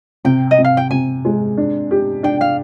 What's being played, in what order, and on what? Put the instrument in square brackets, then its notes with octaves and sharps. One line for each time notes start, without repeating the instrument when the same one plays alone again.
[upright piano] C3 [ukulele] G5
[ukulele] D#5
[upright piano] C3
[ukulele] F5
G5
[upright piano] C3 [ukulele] G#5
[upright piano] G#3
D4
G4
[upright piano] D4 [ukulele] G5
[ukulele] F5